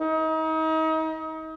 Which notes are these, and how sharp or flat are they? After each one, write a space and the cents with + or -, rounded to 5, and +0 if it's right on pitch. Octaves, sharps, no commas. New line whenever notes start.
D#4 +35